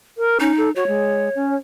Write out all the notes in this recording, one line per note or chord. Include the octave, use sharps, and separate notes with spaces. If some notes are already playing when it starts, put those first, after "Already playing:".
A#4
C#4 D#4
A4
F#4 C#5
G#3
C#4